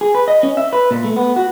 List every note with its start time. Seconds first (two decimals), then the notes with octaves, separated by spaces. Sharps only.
0.01 G#4
0.15 B4
0.28 D#5
0.43 C#4
0.57 E5
0.73 B4
0.91 A#2
1.04 A3
1.16 B3
1.36 F#4